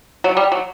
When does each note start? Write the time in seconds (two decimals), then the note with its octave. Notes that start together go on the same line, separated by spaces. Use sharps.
0.24 F#3
0.37 G3
0.52 F#3